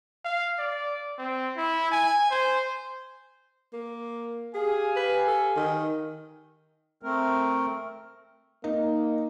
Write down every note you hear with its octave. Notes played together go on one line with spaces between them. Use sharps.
F5
D5
C4
E4
G#5
C5
A#3
G4 G#4 F5 G#5
B4
A4
D#3
A3 C4 A#4
A#3 D#4